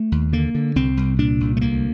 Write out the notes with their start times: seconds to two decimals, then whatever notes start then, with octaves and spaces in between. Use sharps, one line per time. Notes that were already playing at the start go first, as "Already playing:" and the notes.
Already playing: A3
0.12 D#2
0.33 D3 A#3
0.55 D3
0.76 C2 C4
0.97 C2
1.19 A#2 D4
1.40 C2
1.57 A3
1.61 D2 A#3